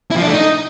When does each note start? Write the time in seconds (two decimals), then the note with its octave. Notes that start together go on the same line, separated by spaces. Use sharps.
0.11 E4
0.16 F3
0.22 D4
0.28 A3
0.33 D#4